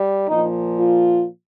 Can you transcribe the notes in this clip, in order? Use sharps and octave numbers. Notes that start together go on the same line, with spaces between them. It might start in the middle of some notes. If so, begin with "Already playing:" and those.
Already playing: G3
A#2 F3 D#4
F4